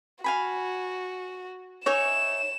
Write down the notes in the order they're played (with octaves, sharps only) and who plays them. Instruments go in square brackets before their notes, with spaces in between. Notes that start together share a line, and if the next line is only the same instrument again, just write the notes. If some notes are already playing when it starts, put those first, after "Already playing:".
[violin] F#4 [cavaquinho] F5 G#5 B5
[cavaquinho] D#4 E5 G#5 [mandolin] C#5 [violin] E7